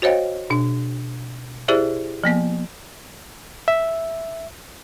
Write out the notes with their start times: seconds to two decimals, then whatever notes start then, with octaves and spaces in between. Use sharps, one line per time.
0.02 F#4 C5 C#5 D#5 F5 G5
0.50 B2 D4
1.68 E4 G4 G#4 C5 D5 E5
2.24 F3 A#3 B3
3.68 E5